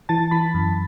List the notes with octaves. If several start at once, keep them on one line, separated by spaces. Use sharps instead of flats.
E3 A5 A6
E3 B5 B6
F#2